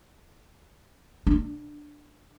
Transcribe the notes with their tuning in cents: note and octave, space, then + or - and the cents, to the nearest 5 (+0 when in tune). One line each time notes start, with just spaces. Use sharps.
D4 +10